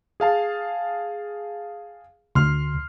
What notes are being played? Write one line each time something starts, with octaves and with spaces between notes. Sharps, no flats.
G#4 F5 A5
D2 C6 F6